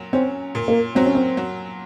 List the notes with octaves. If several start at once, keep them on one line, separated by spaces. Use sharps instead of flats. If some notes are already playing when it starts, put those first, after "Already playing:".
Already playing: A#2 F#3
C4 C#4
A#2
A#3
F#3 C4
C#4
C4
F#3